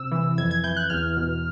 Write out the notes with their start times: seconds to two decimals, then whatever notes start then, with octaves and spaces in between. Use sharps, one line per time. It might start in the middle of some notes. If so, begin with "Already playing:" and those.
Already playing: C3 E6
0.12 E3
0.38 F2 G#6
0.51 G#6
0.64 E3 G6
0.77 F#6
0.90 E2 F6
1.17 B2